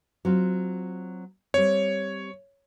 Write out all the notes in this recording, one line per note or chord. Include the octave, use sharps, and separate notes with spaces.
F#3 C4 F4
G3 C4 C#5